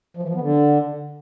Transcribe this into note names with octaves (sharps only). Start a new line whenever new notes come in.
F3
E3
F3
B3
D3